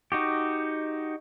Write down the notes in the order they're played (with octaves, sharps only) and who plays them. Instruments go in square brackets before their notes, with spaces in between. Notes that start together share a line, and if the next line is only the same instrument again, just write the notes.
[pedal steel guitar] D#4 F#4 G4